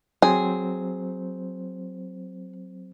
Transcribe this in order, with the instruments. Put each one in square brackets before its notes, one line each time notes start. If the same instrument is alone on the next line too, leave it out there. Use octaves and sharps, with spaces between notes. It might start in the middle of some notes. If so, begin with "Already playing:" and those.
[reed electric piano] F#3 C4 C5 [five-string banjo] G#4